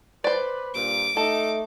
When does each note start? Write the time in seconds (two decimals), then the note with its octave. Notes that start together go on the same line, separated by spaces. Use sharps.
0.24 B4 C5 D5
0.74 G2 A#2 D6
1.17 A3 D#4 A4